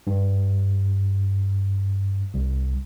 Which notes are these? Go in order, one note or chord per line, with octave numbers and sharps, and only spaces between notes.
G2
C2